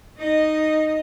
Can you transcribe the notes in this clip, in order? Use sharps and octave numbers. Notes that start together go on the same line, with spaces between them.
D#4 D#5